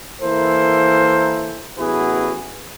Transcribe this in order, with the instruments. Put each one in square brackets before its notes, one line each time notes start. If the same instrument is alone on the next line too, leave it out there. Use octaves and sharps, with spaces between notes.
[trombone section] E3 A#3 E4 A4 A#4 C5
A1 B3 E4 F#4 G#4 B4